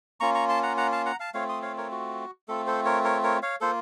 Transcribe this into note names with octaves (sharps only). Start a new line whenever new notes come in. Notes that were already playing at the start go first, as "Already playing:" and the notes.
A#3 C#4 F4 A#5 C#6
A#5 C#6
A5 C6
F#5 A#5
F#5 A#5
F5 A5
F#5 A#5
F5 A5
A3 C4 F4 C#5 F5
C6 D#6
C#5 F5
A#4 C#5
F#4
A3 C4 F4 A4
A4 C5
A#4 C#5
A#4 C#5
A#4 C#5
C#5 F5
A#3 F4 A4 C5